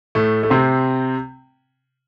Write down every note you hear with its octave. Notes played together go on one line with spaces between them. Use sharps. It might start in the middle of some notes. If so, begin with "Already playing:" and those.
A2 A3
A3
C3 C4